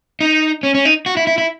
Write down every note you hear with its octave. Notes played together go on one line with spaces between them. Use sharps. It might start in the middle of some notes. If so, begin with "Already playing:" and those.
D#4
C#4
C#4
D#4
F#4
E4
E4
E4